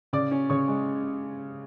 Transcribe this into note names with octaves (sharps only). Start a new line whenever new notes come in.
C#3 D5 D6
C#4
C#3 C#5 C#6
G#3